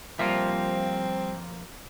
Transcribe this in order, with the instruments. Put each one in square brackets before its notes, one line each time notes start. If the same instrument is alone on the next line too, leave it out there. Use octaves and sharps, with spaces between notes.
[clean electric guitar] F3 A#3 F4 [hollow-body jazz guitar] G3 E5 [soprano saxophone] C4